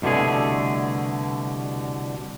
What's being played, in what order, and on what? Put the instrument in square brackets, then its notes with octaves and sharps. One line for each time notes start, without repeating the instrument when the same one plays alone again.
[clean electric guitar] C2 B2 D3 A3 G#4